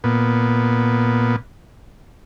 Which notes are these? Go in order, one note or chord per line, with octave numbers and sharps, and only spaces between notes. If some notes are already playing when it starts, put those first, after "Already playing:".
A#2 B3